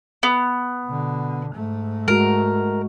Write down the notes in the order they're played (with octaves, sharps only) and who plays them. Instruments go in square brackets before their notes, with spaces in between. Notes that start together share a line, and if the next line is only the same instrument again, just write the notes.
[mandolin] B3
[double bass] B2 D3
G#2 A3
[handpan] G#3 F#4 [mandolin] A#4